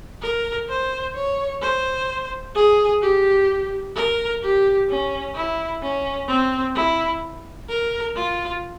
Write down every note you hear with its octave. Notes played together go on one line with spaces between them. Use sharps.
A#4
C5
C#5
C5
G#4
G4
A#4
G4
C#4
E4
C#4
C4
E4
A#4
F4